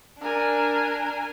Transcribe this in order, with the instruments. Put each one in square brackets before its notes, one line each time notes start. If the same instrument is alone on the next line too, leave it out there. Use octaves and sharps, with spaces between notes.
[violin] D4 [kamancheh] A#4 G#5